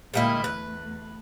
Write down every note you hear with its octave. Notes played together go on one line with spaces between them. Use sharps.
D2 A#2 G3 G#3 A#3 E4 D#5
E2 A3 B4